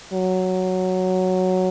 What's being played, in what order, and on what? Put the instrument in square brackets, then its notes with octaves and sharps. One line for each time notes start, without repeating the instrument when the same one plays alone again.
[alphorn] F#3